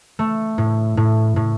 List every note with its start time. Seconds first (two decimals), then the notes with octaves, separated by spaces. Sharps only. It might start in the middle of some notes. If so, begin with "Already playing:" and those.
0.19 A3
0.58 A2
0.97 A2
1.36 A2